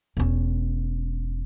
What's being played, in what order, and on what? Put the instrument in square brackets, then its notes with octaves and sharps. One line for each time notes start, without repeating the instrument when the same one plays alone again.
[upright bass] E1 C#4